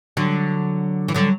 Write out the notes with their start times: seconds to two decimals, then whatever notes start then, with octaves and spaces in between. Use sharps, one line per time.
0.17 D3 F#3
1.08 E3
1.14 D3 F#3